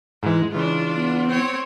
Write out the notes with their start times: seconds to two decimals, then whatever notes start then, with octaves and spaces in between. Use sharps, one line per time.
0.23 G#2 E3 G#3
0.53 C#3 E3 G#3 D4 F4
0.95 B3
1.27 C4 C#5